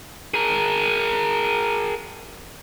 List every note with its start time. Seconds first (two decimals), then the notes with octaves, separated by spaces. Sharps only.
0.34 G#4 A#4